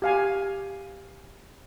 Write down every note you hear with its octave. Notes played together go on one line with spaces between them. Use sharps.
G4 F5 G#5